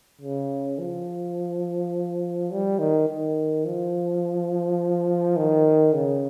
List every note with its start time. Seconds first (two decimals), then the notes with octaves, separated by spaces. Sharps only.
0.21 C#3
0.79 F3
2.51 G3
2.79 D#3
3.08 D#3
3.65 F3
5.37 D#3
5.94 C#3